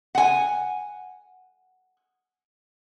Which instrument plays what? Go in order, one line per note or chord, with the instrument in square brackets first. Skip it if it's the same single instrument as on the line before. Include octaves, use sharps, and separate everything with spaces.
[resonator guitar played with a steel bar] F#5 G#5